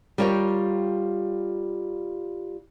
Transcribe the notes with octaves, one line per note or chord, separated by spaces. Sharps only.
G3 F4 A#4 C#5 E5 G5